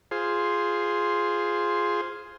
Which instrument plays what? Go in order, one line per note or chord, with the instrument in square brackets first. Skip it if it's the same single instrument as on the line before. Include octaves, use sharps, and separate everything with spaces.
[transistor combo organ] F4 G#4 C5